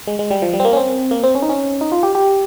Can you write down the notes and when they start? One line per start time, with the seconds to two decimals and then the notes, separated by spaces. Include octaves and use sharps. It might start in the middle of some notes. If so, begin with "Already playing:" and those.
0.07 G#3
0.19 G#3
0.31 G3
0.42 F3
0.53 G3
0.60 C4
0.65 A#3
0.73 C#4
0.77 C4
1.11 A#3
1.23 C4
1.35 C#4
1.42 D#4
1.49 C#4
1.81 D#4
1.92 F4
2.03 G4
2.15 G4